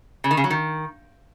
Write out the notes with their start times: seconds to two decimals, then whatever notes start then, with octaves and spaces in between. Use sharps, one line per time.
0.24 C#3
0.31 D#3
0.37 C#3
0.44 F#3
0.50 D#3